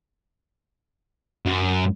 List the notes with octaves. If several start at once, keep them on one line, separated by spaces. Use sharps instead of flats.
F#2